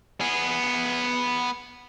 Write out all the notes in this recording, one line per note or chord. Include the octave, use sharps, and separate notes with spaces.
B3 G#4